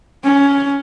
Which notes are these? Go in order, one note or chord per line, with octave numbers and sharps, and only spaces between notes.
C#4